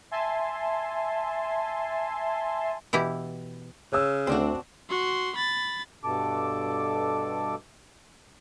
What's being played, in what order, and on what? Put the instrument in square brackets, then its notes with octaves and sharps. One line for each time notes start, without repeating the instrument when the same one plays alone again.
[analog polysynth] E5 G#5 A5 C6
[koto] B2 E3 E4 G4
[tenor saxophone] C#3 [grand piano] C#5 E6
[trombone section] D2 [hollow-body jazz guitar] C4 D4 F#4
[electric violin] F#4 C6
B5 A6
[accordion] G2 B2 A4 D6